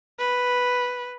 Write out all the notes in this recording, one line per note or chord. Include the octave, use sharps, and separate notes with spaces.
B4